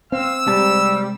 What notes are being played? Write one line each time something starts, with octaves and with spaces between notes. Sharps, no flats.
C4 F5 E6
C3 G3 G#3 A5